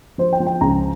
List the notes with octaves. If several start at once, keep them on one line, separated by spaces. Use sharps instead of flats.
F3 C5
G5
F3
G5
C#2 A#5